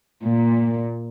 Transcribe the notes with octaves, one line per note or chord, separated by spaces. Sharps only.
A#2